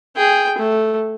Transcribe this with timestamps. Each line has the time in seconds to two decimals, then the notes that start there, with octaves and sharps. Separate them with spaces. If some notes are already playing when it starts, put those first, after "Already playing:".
0.16 G#4 G5
0.58 A3